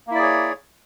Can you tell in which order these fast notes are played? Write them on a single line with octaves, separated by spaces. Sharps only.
A#3 E4 D5 G#4 C#5